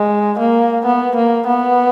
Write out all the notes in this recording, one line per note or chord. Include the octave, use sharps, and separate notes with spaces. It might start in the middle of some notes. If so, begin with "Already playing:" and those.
Already playing: G#3
A#3
B3
A#3
B3